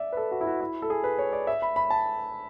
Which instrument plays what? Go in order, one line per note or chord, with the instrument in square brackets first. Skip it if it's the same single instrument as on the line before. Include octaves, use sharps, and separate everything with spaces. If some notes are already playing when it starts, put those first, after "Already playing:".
Already playing: [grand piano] D5 E5
B4
A4
F#4
E4
F#4
E4
A4
G#4
B4
C#5
D5
E5
B5
B5
A5